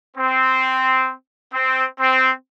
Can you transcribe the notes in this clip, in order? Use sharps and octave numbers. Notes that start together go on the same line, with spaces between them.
C4
C4
C4